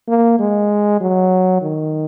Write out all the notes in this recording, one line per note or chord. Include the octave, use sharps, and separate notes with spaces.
A#3
G#3
F#3
D#3